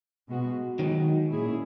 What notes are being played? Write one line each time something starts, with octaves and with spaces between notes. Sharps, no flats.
B2 G#3 B3 F#4
D#3 F#3 G#3 D#4 F#4
A#2 A#3 C#4 E4 G#4